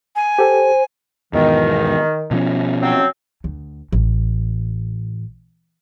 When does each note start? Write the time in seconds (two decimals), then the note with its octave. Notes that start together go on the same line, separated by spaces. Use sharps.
0.15 G#5
0.39 G4 A4 C5
1.33 E2 G#2 B2 D#3
2.31 B2 F3 C#4
2.82 F#3 C4
3.44 D2
3.93 A1